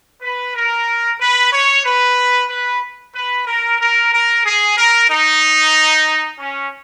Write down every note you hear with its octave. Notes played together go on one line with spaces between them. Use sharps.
B4
A#4
B4
C#5
B4
B4
B4
A#4
A#4
A#4
G#4
A#4
D#4
C#4